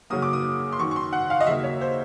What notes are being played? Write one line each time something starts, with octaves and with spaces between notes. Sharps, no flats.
F#2 C#3 F#3 A#3 D#6
D6
D#6
C6
F#2 D#3 F#3 C#6
C#6
C6
F#5
F5
D#5
D#2 C#3 F#3 A#3 E5
C#5
C5